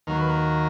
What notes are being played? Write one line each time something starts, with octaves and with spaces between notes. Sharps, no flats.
D#2 D#3 F#3 A#3 A#4
B4
A#4